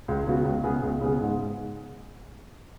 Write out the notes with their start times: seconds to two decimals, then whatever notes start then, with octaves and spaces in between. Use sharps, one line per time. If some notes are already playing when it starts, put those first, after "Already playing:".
0.08 C#2
0.27 C#3 B3 F#4
0.45 C#2
0.63 C#3 B3 G#4
0.83 C#2
1.01 C#3 B3 G#4
1.21 G#2